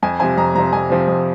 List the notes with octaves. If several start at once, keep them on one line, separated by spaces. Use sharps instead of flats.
F2 G#5
C3 F3 C4 G#5
F2 A#5
C3 F3 C4 A#5
F2 G#5
C3 F3 C4
F2